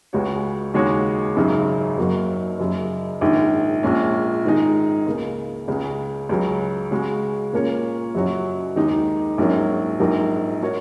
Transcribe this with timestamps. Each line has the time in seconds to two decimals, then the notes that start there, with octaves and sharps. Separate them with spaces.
0.13 C#2 C#3 G#3 F#4 C#5
0.74 D#2 C#3 G#3 F#4 C#5
1.36 G#1 F#2 C#3 F#3 D#4
1.98 F#1 F#2 F#3 A#3 F#4
2.59 F#1 F#2 C#3
3.21 A#1 G#2 D#3
3.83 A#1 A#2 G#3 C#4
4.45 G#2 D#3 G#3 D#4 G#4
5.07 C#2 C#3 A#3
5.68 C#2 C#3 G#3
6.29 C#2 C#3 F#3
6.91 C#3 G#3 F#4
7.53 A#2 A#3 C#4 A#4 C#5
8.14 F#1 F#2 F#3 C#4 F#4
8.76 D#2 D#3 G#3 D#4
9.38 A#1 G#2 F#3 A#3 C#4
9.99 A#1 G#2 F#3 D#4 A#4
10.62 G#3 F#4 A#4 C#5